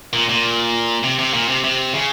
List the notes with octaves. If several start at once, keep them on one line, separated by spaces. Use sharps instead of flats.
A#2
A#2
C3
C3
A#2
C3
C3
C#3